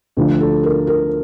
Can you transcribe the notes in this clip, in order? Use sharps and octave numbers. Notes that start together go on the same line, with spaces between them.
D2 D3 F3
A4
A#4
A#4